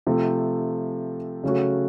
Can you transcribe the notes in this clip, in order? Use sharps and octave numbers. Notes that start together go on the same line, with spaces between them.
C3 F3 A3
C#3 F#3 A3 C#4 F#4